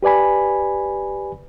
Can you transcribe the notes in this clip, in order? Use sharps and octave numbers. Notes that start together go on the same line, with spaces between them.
G4 B4 D5 G#5 B5